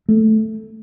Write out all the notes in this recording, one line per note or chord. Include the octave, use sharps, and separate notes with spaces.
A3